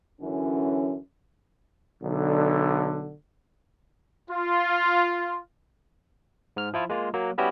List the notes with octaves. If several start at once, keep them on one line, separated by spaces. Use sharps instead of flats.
F#2 D3 E3 C#4
B1 D3
F4
G#2 F6
F3 E4 F4
G#3 A#3 F4
F#3 A#3
G3 B3 C#4 E4 F#4 G4